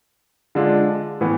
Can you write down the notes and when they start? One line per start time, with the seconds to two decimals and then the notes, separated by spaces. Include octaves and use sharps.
0.55 D3 G#3 D4 F4
1.21 A2 E3 B3